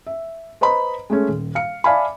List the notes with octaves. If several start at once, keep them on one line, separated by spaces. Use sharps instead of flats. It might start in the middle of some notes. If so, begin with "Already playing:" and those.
E5
B4 C5 D#5 A#5 B5
G#3 A3 C#4
D#1
F5 C#7
D5 E5 F5 G#5 A5 B5